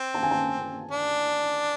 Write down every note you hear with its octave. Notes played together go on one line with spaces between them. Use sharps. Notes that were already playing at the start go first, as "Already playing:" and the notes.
Already playing: C4
A5
G#5
A5
D4